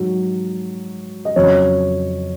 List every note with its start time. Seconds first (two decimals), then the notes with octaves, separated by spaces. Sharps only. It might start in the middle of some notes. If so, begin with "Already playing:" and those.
Already playing: G#2 F#3
1.25 D#5
1.36 F2 C#3 F#3 C#5